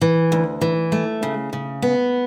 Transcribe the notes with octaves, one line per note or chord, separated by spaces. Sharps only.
E3
D2
E3
A3
C#3
C#3
B3